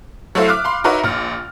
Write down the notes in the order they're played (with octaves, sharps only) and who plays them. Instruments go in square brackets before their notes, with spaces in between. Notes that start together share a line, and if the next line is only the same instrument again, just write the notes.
[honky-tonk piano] F#3 A3 E4 A4 C5 F5
E5 D6 F6 F#6
F5 B5 C6
D#4 F#4 A#4 B4 C#5 E5
A#1 F6